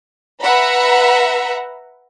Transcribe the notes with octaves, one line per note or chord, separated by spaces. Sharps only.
B4 E5 F#5 A#5 B5